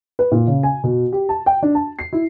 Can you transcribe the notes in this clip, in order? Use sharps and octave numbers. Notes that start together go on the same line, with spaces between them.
B4
A#2
C#3
G#5
B2
G4
A5
G5
D4
A5
C7
E4